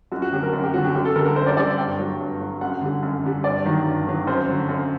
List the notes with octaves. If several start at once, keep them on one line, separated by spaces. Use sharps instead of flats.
F#2 F#4
F#4
D3 F#3 G4
A#4
F#2
G4
D3 F#3 F#4
G4
F#2 G4
A4
D3 G3 A#4
A#4
F#2 C5
D5
D3 G3 D5
G2 G5
F#3
G2
F#3
F#2 F#5
D3 G3
F#2
D3 G3
G2 D5
D#3 F#3
G2
D#3 F#3
F#2 C5
D3 F#3
F#2